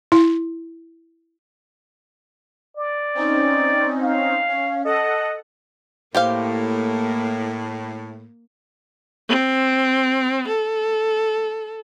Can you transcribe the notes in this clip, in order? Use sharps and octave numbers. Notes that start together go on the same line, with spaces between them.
E4
D5
C4 C#4 D#4
F5
C#4
A4 D#5 F#5
A2 A#3 G4 C5 F5
C4
A4